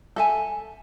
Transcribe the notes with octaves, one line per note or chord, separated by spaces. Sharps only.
A4 E5 G#5